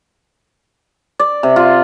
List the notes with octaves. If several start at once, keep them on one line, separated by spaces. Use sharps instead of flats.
D5
C3
F4